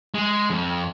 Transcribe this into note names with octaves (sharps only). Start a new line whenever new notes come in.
G#3
F2